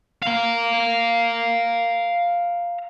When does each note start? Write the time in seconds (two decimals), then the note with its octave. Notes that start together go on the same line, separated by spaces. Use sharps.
0.23 F5 A#5